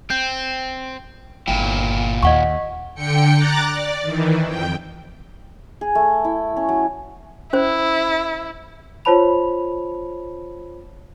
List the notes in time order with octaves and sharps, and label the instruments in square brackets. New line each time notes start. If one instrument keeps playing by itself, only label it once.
[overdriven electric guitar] C4 [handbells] G6
[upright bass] G1 [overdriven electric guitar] A#2 E4 [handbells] G5
[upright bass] D#2 [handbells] D#5 F#5 C#6
[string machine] D3 G5 C#7
A#5 D6 F#6 A6
D5
D#3 E3
F2 G5
[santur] G#4
A3
E4
C#4
F#3
[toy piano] C#4 C5 [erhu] E4
[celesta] F4 C5 C#5 A5 B5 F7